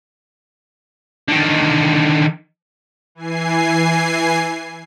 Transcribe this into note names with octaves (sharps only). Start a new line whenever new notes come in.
D3 D#3
E3 G#5 C7